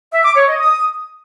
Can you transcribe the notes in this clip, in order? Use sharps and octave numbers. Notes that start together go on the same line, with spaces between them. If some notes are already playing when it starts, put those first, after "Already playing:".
E5
D6
C#5
D#5
D#6